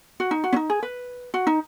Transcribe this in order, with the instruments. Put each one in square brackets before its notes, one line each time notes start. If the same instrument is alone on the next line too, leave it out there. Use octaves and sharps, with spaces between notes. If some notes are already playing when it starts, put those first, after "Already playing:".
[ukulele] F#4
D#4
F#4
C#4
D#4
G#4
B4
F#4
D#4